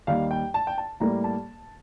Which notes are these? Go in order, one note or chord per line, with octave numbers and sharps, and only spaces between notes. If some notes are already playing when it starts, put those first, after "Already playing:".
D#2 D#3 G3 F5
G5
A5
G5
A5
A2 G3 A#3 A#5
A5